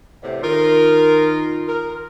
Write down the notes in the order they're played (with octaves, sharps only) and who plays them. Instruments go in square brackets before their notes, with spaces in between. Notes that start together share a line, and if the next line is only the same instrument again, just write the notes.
[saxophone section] E2 A2 C3
[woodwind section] D#3 D#4 F4 [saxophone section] A#4
[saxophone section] A#4